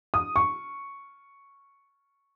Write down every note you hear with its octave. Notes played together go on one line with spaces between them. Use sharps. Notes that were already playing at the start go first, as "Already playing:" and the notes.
D#6
C#6